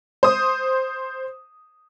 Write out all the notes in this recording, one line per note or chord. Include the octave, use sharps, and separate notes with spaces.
C5 D#6